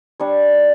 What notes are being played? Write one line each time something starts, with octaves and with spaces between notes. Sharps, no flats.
G3 D4 C#5